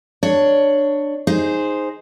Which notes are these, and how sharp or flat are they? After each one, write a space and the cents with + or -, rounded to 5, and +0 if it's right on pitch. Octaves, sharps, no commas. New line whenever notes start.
D4 +10 C#5 +5
D#4 +0 G#4 +0 C5 +0